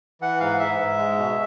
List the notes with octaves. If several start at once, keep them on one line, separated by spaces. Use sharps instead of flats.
E3 F#5
G#2 F5
G#2 E5
G#2
G#3
B2